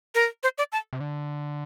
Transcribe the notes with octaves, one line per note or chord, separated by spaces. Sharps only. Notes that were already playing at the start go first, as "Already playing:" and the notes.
A#4
C5
D5
A5
C3
D3